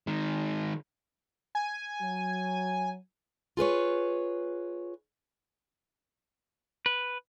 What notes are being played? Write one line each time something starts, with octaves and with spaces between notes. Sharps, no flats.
D#3 G#3
G#5
F#3
F4 G#4 B4 C#5
B4